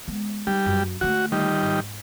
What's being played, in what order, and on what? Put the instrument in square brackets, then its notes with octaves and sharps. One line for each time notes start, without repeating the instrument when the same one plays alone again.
[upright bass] G#3 B3
[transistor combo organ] G3 [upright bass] D#4
[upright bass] F#2
[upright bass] D3 A3 [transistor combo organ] F#4
[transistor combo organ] D#3 G3
[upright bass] G#2